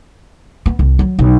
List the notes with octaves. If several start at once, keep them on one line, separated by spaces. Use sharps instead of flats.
B3
C2
F#3
B1